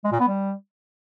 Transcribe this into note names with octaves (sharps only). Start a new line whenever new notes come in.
G#3
A#2
B3
G3